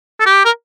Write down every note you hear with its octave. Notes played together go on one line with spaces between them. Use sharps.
A4
G4
A#4